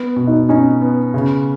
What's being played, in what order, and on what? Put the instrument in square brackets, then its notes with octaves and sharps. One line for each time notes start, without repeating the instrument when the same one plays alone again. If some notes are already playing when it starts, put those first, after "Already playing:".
Already playing: [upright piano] B3
B2
[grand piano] D#4
[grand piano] C#4 [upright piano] D#4
[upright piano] B3
C#3